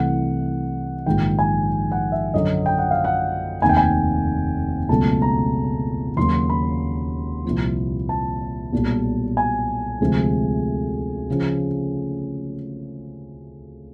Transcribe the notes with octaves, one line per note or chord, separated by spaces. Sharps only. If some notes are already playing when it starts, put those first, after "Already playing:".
Already playing: C2 C3 E3 A3 F#5
A#1 G#2 D#3 G#3 G5
G#5
F#5
E5
F#2 D3 F#3 D#5
G5
F#5
F5
F#5
F1 D#2 D#3 G#5
G5
G#5
C#2 B2 F#3 A3 A5
A#5
D#2 C#3 F#3 A#3 C6
B5
C2 A#2 F3
A5
B1 A#2 G3
G#5
D2 C3 F3 G#3
C#3 F3